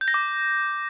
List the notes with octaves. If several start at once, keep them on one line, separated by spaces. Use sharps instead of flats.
G6
A#6
D6